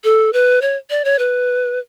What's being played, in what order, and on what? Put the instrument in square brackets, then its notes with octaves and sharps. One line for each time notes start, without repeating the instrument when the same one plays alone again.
[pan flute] A4
B4
C#5
D5
C#5
B4